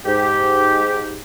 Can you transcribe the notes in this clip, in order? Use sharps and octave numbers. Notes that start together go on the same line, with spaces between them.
G#2 G4